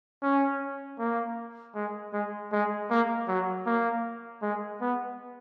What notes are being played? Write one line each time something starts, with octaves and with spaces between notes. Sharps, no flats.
C#4
A#3
G#3
G#3
G#3
A#3
F#3
A#3
G#3
B3